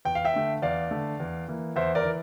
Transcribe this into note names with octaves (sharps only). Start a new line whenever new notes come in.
E2 G5
F5
E5 G5
D3 A3
E2 D5 F5
D3 A3
E2
E3 A#3
E2 C5 E5
A#4 D5
E3